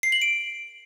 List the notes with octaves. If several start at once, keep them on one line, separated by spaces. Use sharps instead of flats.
C7
F#7
D7